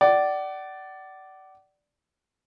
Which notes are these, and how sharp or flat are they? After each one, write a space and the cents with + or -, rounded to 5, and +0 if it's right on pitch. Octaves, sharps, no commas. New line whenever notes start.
D5 +0 F#5 +40